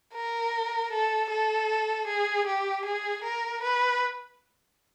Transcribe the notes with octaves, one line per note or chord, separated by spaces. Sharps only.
A#4
A4
A4
G#4
G4
G#4
A#4
B4